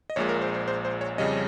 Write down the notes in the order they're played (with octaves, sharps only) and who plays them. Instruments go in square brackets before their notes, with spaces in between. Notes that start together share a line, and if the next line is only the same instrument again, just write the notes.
[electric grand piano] D#5
A#1 A#2 G#3 C#5
A#4
C5
C5
C5
C5
C#5
F2 C#3 G3 C#4 D#5